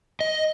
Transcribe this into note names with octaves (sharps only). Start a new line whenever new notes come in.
D#5